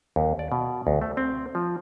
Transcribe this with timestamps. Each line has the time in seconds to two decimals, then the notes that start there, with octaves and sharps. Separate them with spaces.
0.16 D#2
0.39 D5
0.52 B2
0.87 D2
1.02 A3
1.17 C4
1.55 F3